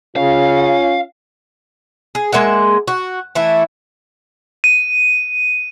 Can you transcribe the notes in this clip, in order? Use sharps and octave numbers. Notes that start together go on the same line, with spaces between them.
C#3 C#4 F4 F5
G#4
G#3 A#3 E5 F#5
F#4
E3 A3 E4
D#7